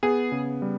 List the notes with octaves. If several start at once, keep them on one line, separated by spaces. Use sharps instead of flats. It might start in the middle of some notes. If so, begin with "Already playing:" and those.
B3 G#4
C#3
G3